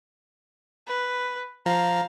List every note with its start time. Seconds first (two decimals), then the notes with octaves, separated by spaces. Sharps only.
0.87 B4
1.66 F3 F5 A#5